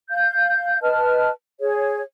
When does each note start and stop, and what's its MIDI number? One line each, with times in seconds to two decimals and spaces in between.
0.10 0.78 77
0.10 0.78 91
0.82 1.30 71
0.82 1.30 75
0.82 1.30 81
0.82 1.30 89
1.60 2.02 68
1.60 2.02 73